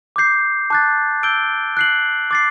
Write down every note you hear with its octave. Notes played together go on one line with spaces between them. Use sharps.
D6 G6 C7
A5 D6 F#6 A6
E6 G6 D7 G7
F#6 C7 F#7
D6 A6 C7